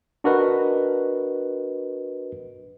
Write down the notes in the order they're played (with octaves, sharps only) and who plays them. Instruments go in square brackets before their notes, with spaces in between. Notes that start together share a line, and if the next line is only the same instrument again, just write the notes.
[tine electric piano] D4 F#4 A#4 B4 D#5